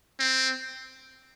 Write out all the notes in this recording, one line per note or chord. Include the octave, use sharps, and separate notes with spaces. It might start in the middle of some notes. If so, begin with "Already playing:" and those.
C4